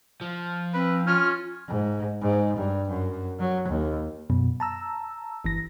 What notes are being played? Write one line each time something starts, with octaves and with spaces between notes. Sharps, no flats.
F3
C4 B4
C#4 F4 F6
G#2
G#2
G2
F#2
F#3
D#2
F#2 B2
A5 A#5 E6
G1 E3 A#6